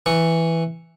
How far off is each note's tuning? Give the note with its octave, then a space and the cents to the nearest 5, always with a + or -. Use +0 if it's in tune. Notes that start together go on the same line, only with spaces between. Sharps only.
E3 +0 C#6 +0